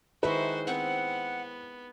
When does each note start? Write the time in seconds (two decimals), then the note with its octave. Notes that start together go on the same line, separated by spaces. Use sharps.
0.23 D#3 G#3 E4 F#4 B4 C5 E5
0.67 B3 C4 F#5 C#6